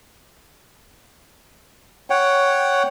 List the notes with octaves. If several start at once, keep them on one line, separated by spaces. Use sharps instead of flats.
C#5 F#5 G5